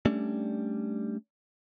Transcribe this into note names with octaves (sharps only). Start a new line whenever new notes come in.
G3 A3 C#4 D4